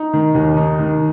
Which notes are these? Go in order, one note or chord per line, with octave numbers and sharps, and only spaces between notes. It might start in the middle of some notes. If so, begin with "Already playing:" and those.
Already playing: D#4
D#3
D#2
D#4
D#3